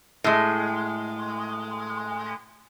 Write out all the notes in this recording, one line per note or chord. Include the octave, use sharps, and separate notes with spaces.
A2 G#3